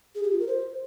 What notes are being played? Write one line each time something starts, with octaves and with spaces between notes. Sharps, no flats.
G#4
G4
F4
A#4
C5